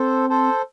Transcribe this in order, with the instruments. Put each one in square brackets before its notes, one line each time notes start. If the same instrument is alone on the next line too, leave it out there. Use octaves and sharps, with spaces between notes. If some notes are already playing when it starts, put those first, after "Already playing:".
Already playing: [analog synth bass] C4 [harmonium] A4 C5
[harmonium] A4 C5